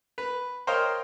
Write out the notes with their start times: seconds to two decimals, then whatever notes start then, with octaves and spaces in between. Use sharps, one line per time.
0.18 B4
0.67 A#4 C5 C#5 D#5 F5 G5